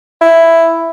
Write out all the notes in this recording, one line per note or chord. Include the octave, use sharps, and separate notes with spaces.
E4